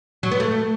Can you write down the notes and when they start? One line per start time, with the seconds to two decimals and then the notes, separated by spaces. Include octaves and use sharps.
0.23 F#3
0.31 B3
0.40 A3